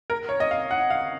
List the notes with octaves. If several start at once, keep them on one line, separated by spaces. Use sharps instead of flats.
A#4
C#5
D#5
F5
F#5
F5